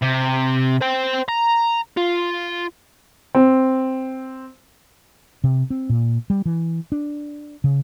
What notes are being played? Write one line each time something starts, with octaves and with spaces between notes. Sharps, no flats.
C3
C5 G5
A#5
F4
C4
C3
C4
A#2
G3
E3
D4
C#3